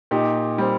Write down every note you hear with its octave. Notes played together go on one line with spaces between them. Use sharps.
A#2 D#4 G4
G3 C4